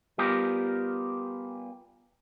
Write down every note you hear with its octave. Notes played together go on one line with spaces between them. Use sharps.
G3 B3 F4 G4 G#4 A#4